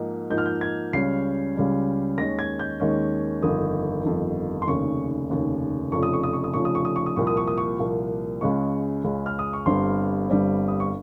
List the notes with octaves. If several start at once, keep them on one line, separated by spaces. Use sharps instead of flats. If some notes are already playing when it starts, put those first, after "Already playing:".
Already playing: G#2 F3 A#3 D#4
G#2 F3 A#3 D#4 G6
F6
G6
G#6
C#2 C#3 G3 C#4 C7
C#2 C#3 G3 C#4
D#2 D#3 G#3 C#4 A#6
G#6
G6
D#2 D#3 G#3 C#4
G1 F2 D#3 D#6
G1 F2 D#3
C6
F1 D#2 C#3 C#6
F1 D#2 C#3
F1 F2 C#3 F3 C#6
D#6
C#6
D#6
C#6
D#6
F1 F2 C#3 F3 C#6
D#6
C#6
D#6
C#6
D#6
C2 A#2 F3 A#3 C#6
D#6
C#6
D#6
C#6
C2 A#2 F3 A#3
C#2 C#3 G#3 C#6
C#2 C#3 G#3
F6
D#6
C#6
G1 G2 G3 C4 C6
G1 G2 G3 C4
D#6
C#6